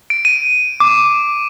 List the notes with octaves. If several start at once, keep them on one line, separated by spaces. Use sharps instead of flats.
D7
D#7
D6